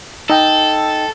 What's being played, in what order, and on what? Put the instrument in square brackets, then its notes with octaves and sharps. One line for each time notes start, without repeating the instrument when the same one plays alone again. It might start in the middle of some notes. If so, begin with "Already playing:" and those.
[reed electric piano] D#4 D#5 G5 [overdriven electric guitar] A4